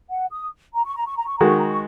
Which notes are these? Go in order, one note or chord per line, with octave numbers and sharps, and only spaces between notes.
F#5
D#6
A#5
C#6
A#5
C#6
A#5
C#6
D#3 G#3 F#4 A#5
C#6
A#5
C#6